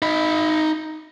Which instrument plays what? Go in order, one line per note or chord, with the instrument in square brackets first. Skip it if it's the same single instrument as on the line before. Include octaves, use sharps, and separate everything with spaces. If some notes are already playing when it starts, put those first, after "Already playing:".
[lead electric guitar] D#4 B5